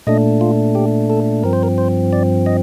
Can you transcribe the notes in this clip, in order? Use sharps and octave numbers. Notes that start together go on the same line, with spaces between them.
A#2 A3 D4 D#5
F4
G4
A4
G2 F3 C4 A#4
C5
A#4
C5
D5
D#5